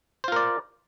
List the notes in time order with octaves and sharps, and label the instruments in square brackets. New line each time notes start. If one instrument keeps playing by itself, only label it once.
[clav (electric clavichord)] C5
F4
A#4
D5